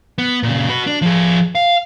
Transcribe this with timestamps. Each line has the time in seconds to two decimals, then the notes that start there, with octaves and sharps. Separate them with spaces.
0.18 B3
0.43 A#2 C#3
0.69 F#4 B4
0.87 D4
1.02 F3 G#4
1.55 F5